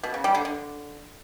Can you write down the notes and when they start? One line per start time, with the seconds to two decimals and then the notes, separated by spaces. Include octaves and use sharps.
0.03 B2
0.14 C#3
0.24 G3
0.35 D3
0.45 D3